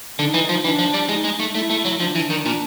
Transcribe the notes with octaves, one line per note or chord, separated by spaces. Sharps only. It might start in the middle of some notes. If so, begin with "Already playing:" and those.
D3 D#4
E3
F3
E3 D4
F3
G3
D4
G#3 E4
D#4
G#3
A3
A3 E4
A3
F#3
F3 D#4
D4
E3
D#3
A#2